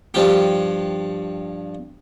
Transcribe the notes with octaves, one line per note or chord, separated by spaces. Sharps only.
G2 F3 G4